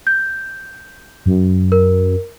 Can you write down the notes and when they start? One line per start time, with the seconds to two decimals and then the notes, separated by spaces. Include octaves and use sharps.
0.07 G6
1.26 F#2
1.72 A#4